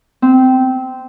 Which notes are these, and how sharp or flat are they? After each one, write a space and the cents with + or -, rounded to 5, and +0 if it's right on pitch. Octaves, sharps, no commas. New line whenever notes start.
C4 -15